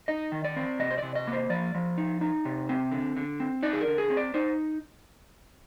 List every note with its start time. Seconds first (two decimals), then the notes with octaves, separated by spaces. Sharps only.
0.08 D#4 D#5
0.32 D#3
0.45 D5
0.56 C4
0.79 C3 D#5
0.91 C5
0.98 C3 D5
1.15 D#5
1.27 A#3
1.33 C5
1.50 F3 D5
1.75 F3
1.98 D#4
2.21 D#4
2.45 C3
2.69 C4
2.92 D3
3.16 D3
3.40 C4
3.63 D#4 D5
3.73 G#4
3.81 A#4
3.87 D3
3.98 G#4
4.10 C4
4.17 D5
4.34 D#4 C5